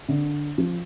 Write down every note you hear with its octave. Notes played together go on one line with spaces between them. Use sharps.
D3
F3